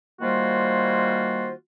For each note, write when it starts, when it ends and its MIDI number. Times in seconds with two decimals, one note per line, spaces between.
0.21 1.52 51
0.21 1.52 55
0.21 1.52 58
0.21 1.52 65
0.21 1.52 66
0.21 1.52 72